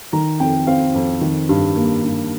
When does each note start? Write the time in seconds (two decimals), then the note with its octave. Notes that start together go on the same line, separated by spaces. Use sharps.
0.13 D#3 A#5
0.40 F2 G5
0.67 C4 F5
0.95 F2
1.21 D#3
1.49 G2
1.76 A#3
2.04 G2